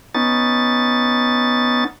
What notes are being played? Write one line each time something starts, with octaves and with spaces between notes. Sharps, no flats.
B3 C#4 D#4 A6